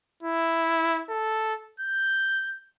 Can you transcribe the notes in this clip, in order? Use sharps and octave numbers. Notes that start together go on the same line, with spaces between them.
E4
A4
G6